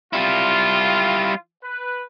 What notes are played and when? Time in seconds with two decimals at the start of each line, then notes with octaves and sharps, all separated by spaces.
0.13 G3 E4 F4
1.63 B4